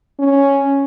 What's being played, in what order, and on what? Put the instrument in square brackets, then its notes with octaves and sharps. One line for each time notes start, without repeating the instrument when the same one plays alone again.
[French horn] C#4